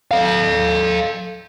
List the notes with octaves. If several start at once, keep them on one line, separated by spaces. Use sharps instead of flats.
A4 F5